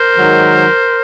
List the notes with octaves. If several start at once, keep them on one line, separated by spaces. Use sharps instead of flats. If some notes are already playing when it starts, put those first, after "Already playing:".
Already playing: A#4 C5
G#2 D#3 F#3